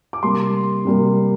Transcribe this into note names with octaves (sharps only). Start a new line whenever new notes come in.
D6
C3 G3 A#3 C6
C3 G3 A#3